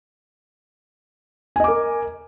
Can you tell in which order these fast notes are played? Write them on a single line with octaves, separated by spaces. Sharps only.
G#5 D#5 D6 A#4